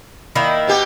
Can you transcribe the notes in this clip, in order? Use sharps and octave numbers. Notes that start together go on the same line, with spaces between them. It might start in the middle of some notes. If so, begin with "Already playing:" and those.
D#3 A#3 E4
B2 B3 G4